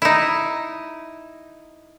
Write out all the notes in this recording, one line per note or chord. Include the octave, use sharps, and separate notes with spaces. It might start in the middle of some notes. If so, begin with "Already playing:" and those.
D#4 E4